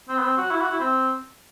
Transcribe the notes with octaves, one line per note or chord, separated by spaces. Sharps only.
C4
B3
C4
F#4
E4
F#4
E4
C4